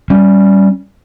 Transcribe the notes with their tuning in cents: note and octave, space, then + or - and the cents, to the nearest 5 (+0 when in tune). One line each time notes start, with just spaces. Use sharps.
G3 -5 C#4 +0